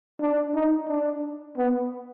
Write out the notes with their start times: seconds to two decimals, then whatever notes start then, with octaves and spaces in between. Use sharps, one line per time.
0.20 D4
0.54 D#4
0.89 D4
1.57 B3